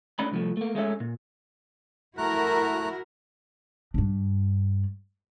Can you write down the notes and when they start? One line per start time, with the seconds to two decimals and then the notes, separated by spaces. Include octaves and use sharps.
0.19 A3 C#4 D4 B5
0.32 C2 F3 A3
0.57 A3 A#3
0.75 G#3 A3 C#4 E5
1.00 A#2
2.18 A3 E4 F#4 A#4 A#5 F#6
3.94 G2 D4